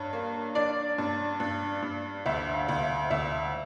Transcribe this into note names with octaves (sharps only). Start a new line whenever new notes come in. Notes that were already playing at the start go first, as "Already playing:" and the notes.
Already playing: G2 C#5
A#3
D4 D5
G2
G2
G2
D2 E5
F5
D2
E5
D2 E5